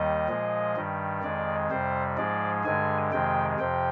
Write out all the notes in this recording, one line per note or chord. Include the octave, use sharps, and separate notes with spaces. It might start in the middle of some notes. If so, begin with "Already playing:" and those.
Already playing: D#2 D#3 G3 D#5
A#2 F3 G#3
G2 D#3 G3
F2 D#3 G#3 D5
F2 C3 G3 C5
G#2 F3 G#3 D5
G2 D3 G#3 G#5
F2 C3 D#3 G#3 G5
F2 C3 F3 G5